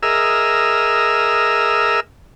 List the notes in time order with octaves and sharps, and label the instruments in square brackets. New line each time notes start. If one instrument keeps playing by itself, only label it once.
[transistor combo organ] G#4 A#4 D#5 E5 E6 F6